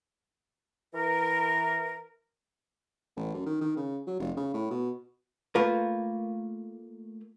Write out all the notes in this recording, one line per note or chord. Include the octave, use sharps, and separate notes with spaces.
E3 A#4
A1
F#2
D#3
D#3
C#3
F#3
F1
C#3
A2
B2
A3 A#3 F4 A#4 B4